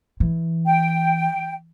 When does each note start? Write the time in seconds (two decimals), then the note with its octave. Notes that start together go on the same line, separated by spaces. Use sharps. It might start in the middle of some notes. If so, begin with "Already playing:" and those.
0.20 E3
0.65 G5